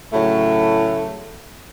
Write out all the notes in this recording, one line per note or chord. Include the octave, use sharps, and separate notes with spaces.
A2 C#3 F#3 A3